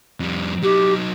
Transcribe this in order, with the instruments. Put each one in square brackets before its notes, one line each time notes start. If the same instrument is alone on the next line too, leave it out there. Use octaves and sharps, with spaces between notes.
[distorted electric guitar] F2 G3
[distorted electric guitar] F#3 D#4 [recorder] G4